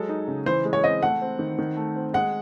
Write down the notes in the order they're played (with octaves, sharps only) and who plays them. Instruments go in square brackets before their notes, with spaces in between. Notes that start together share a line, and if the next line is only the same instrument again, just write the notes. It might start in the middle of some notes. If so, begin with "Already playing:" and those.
Already playing: [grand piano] F#3 G#3 [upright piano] A4
[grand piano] D#4
C#3
[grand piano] E3 [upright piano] C5
[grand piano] G#3
[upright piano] C#5
[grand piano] C4 [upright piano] D#5
[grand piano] A3 [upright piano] F#5
[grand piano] C4
D#3
D#3
A3
C4
[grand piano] G#3 [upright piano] F#5